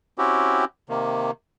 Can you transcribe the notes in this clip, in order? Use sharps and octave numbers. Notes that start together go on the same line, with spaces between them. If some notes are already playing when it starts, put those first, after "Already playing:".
C4 C#4 E4 F#4 G4
C3 D#3 A#3